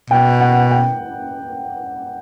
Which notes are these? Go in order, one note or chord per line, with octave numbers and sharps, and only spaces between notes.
B2 G5
F#5
G5